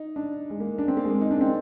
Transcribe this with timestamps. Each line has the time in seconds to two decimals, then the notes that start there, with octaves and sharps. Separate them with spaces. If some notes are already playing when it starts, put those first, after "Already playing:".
Already playing: D#4
0.16 D4
0.50 G#3
0.60 A#3
0.78 D4
0.88 C4
0.97 A#3
1.05 G#3
1.21 D#4
1.31 D4
1.41 C4